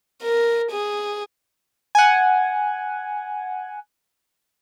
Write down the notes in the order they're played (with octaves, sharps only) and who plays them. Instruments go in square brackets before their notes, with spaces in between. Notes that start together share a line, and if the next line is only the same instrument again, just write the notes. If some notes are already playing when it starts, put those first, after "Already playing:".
[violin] A#4
G#4
[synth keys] F#5 G#5